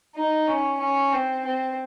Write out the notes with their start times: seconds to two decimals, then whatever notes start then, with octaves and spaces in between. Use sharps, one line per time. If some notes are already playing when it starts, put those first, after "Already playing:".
0.15 D#4
0.47 C#4
0.80 C#4
1.12 C4
1.44 C4